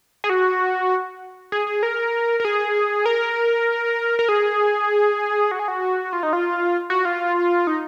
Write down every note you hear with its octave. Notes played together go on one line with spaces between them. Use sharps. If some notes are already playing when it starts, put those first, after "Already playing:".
G#4
F#4
G#4
G#4
A#4
A#4
G#4
A#4
A#4
G#4
F#4
G#4
F#4
F4
D#4
F4
F#4
F4
D#4